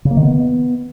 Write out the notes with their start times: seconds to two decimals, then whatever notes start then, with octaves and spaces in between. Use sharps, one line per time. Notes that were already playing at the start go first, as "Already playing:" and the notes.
0.05 C#3
0.11 A#3
0.17 D#3
0.23 B3